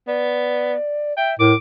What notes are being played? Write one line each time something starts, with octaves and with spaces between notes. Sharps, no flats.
B3 D5
E5 G5
A2 A#4 D6